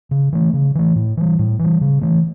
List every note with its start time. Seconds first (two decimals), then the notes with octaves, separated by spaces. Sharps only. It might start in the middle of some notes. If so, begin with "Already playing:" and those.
0.11 C#3
0.33 E3 A3
0.53 C#3
0.75 E3 A3
0.96 A2
1.17 E3 G3
1.39 A2
1.59 E3 G3
1.81 C#3
2.01 E3 A3